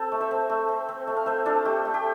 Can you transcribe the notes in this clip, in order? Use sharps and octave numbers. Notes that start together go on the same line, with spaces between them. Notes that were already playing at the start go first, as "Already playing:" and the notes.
Already playing: C4 A4
A3
C5 E5
C4
A3
C4
C4
A3
F5
A3 C5 E5
D4 F4 A4
A3 G4
A3
G4